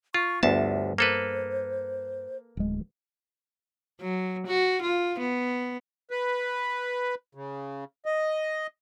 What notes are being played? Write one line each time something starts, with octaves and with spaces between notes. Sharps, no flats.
F4 C#6
G1 D2 G2 B3 E5 A5
A#3 A4 B4 C5
D1 G#3
F#3
F#4
F4
B3
B4
C#3
D#5